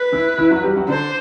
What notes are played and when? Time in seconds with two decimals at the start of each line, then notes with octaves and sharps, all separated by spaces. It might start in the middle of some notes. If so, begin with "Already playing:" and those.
Already playing: B4
0.12 E3 E4
0.38 E3 E4
0.50 F#3 F#4
0.63 G3 G4
0.75 F#3 F#4
0.88 D3 D4 C5